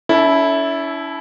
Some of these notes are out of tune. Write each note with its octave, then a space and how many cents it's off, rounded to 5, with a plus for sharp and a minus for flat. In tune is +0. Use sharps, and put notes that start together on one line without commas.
C#4 +40 E4 -10 A4 +0